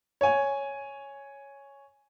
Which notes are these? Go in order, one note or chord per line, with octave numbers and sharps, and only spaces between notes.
C#5 G#5